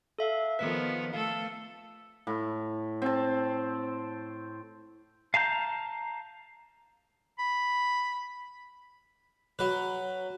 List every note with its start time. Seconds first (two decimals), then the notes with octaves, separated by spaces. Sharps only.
0.19 A4 E5 F5
0.59 D#3 F3 B3 B4 B6
1.14 A3 A4 F5
2.27 A2
3.02 C4 A5
5.34 F5 A5 A#5 G6
7.39 B5
9.59 F#3 B4